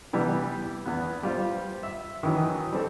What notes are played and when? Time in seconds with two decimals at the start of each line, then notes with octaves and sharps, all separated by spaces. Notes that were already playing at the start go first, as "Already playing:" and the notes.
0.13 C3 E3 G3 B3
0.86 E2 B3
1.23 G3 F4 C5
1.83 E5
2.23 D#3 E3 F#3
2.72 G3 C4 A4